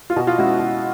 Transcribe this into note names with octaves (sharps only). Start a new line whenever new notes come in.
F4
B2 F#4
F4
G#3 C#4 E4 F#4
B2